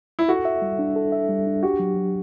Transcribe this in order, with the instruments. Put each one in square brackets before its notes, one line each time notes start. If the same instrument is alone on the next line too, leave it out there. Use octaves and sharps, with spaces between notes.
[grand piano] E4
[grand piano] F#4 [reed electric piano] A4
[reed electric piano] E5
G3
D4
A4
E5
G3
D4
[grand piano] F#4 [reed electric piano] G4
[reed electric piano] F#3
F#3